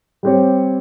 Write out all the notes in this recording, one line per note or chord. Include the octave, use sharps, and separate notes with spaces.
G3 C4 G4 C#5